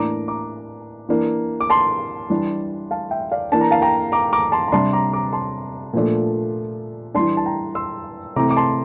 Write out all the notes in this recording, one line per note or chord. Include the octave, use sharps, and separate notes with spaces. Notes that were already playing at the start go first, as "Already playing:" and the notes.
Already playing: A2 E3 A#3 D4 A#5 D6
A#5 D6
E3 A#3 D4
D6
A5 C6
E3 G3 D4
F5 A5
E5 G5
D5 F5
E3 A#3 D4 A5
A#5
F5 A5
G5 A#5
A#5 D6
A#5 D6
A5 C6
A#5
C3 G3 D4 A5 C6
A#5 D6
A#5 D6
A5 C6
A#2 F3 A3 D4
E3 G3 D4 A5 C6
A5
G5 A#5
C6 E6
C3 E3 A3 C4 A#5 D6
D6
A5 C6